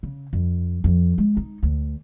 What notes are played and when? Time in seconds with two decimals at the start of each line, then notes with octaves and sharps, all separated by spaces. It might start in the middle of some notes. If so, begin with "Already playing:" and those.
0.03 C#3
0.33 F2
0.84 F2
1.18 G#3
1.37 D#4
1.63 D2